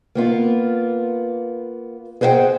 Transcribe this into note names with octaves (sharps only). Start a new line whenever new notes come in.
A#3 B3 F4
G#4 B4 C5 E5 F#5 G5